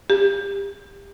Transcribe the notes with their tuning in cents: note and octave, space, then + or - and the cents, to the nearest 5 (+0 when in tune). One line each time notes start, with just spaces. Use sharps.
G4 +25